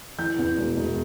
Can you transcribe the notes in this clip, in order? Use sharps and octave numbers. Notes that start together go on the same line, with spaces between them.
E3 G6
E2
E1
E1